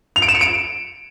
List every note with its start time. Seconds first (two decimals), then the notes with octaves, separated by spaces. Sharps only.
0.16 F7
0.22 D7
0.28 E7
0.35 C#7
0.41 D7